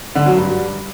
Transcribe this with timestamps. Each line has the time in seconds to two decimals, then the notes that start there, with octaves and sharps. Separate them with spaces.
0.15 D3
0.26 F#3
0.37 G2